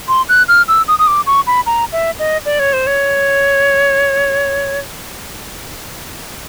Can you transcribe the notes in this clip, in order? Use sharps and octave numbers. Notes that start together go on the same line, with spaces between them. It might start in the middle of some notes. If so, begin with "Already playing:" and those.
C6
F#6
F6
E6
D#6
D#6
D6
C#6
B5
A#5
E5
D#5
D5
C#5
C5
C#5